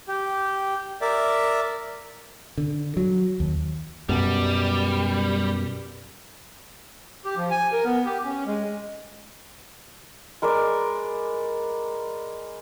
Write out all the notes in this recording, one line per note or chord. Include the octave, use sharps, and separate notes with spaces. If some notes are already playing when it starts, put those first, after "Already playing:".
G4
A#4 D5 E5
D3
F#3
D#2
F#2 B2 G3
G4
F3
G#5
A#4
B3
G4
C#4
G#3
G#3 A#4 B4 D5